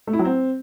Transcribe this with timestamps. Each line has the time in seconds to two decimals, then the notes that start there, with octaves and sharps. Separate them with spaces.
0.07 A3
0.13 E4
0.19 F#3
0.25 C4